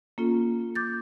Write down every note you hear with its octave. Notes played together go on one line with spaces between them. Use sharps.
A#3 C#4 F4 A4
D6 G6 A6